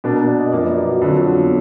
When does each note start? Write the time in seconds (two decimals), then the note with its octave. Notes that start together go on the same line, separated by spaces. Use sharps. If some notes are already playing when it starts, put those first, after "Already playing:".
0.04 B2 A#3 D4
0.16 A#4
0.28 D5
0.40 D#5
0.52 F#2 F3 A#3 D5
0.65 B4
0.77 A#4
0.89 F#4
1.01 F2 D3 F#3 F4
1.14 F4
1.27 D4
1.39 B3